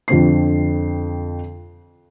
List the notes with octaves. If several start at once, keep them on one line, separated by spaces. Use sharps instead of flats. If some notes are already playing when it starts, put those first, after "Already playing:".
F2 D3 C4 C7